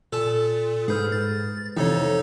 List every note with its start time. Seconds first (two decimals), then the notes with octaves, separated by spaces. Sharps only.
0.13 A#2 A4 A5
0.88 G#2 G#4 B4 F6 G6
1.12 A6
1.77 F2 C3 E3 D#4 A4 C#5